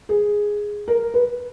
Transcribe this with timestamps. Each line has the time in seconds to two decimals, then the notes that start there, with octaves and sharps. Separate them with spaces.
0.09 G#4
0.88 A#4
1.14 B4